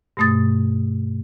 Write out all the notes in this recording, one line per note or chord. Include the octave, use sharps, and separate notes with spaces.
G2 B2 A3 D#6 A6